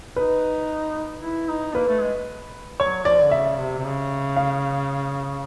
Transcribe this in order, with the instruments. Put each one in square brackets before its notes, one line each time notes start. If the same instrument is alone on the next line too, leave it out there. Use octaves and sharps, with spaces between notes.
[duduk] D#4 [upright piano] B4
[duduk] E4
D#4
[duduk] A#3 [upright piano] B4
[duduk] A3
G#3
[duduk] F#3 [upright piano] C#5
[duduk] F3 [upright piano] D5
[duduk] D3
[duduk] C#3 [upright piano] E5
[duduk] C3
C3
C#3
[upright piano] F5